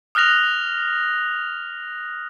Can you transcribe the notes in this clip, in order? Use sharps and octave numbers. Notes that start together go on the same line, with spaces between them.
D#6 F6 F#6 A#6 F7